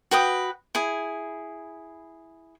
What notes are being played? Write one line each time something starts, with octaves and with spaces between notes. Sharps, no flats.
F#4 B4 G5 D#6
E4 G#4